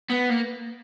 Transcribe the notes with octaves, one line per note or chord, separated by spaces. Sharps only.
B3
A#3